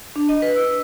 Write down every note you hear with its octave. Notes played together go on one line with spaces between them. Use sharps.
D4
D#5
B4
E6